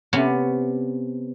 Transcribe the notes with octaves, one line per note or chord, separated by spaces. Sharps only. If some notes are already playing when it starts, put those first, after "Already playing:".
C3 B3 C#4